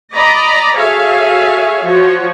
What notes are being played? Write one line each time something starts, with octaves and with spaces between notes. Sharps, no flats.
D5 D#5 A#5 B5
F#4 G#4 A4 C#5 E5 F5
F3 F#4 C#5